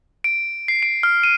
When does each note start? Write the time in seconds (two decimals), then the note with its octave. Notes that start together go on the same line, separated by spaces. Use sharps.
0.24 D7
0.68 C7
0.83 D7
1.03 F6
1.24 D#7